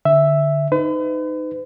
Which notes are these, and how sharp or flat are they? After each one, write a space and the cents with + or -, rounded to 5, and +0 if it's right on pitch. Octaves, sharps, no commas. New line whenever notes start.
D3 +0 E5 +0
D#4 -5 B4 +40